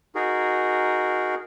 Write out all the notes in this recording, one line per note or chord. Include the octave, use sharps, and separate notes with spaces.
D#4 F#4 G#4 A#4